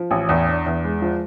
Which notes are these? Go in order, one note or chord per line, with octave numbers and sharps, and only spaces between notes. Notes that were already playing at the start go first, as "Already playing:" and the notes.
Already playing: F3
A1
E2
D4
E2
G#3
F3